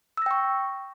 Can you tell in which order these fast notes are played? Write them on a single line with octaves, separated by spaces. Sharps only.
E6 A#6 G5 C#6